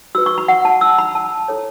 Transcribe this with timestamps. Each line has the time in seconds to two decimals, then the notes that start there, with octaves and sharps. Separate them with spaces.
0.15 F#4 B4 E6
0.26 C#6
0.38 B5
0.48 F#5
0.65 A5
0.81 E6
0.98 B5
1.15 A5
1.48 E4 A4 C#5